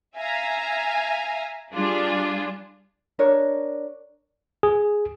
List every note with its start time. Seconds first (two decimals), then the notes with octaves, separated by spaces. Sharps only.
0.16 E5 F5 G#5 A#5
1.73 G3 D4 F4 G#4
3.19 D4 A#4 C#5
4.63 G#4